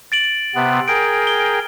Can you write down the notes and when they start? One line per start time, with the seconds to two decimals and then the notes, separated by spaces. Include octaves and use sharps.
0.12 A6 D7 F#7
0.55 C3 B3
0.88 G#4 A#4 G5 D7
1.27 G7